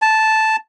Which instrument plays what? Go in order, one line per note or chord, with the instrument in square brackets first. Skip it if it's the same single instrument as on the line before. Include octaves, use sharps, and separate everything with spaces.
[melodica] A5